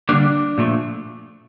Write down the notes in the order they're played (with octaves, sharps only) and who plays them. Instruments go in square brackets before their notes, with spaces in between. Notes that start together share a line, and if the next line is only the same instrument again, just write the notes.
[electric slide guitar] D3 G3 A#3 D4
A#2 F3 A3